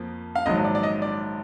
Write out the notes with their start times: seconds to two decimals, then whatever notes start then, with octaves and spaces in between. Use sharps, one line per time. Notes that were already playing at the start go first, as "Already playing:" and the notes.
Already playing: F2 F3 A#3
0.35 F5
0.46 A#1 G#2 D#3 F#3 D#5
0.64 D5
0.75 D5
0.83 D#5
1.02 D5